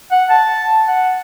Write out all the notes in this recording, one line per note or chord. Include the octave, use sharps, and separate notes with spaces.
F#5
A5
F#5